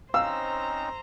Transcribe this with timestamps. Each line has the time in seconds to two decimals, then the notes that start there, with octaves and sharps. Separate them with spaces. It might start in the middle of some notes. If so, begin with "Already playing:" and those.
0.14 C4 C#4 D#4 C5 F5 A#5 E6